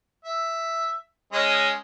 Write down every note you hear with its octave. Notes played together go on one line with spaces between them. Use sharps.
E5
G#3 C#4 D#5